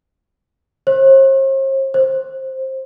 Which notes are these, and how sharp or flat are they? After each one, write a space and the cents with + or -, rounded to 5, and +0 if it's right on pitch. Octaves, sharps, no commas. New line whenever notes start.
C5 +45
C5 +15